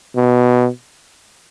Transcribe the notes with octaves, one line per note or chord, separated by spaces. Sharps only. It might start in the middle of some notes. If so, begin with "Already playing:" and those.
B2